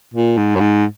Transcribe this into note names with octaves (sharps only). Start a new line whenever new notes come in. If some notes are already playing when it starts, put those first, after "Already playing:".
A#2
G#2
F#2
G#2